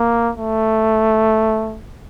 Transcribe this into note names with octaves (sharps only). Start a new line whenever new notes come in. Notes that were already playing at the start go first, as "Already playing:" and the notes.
Already playing: A#3
A3